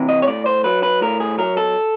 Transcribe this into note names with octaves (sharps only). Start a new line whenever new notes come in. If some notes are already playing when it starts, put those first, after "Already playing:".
Already playing: C3 E3
D#5
C#5
A2 D5
C5
F#3 B4
B4
A2 A#4
G#4
F#3 A#4
A4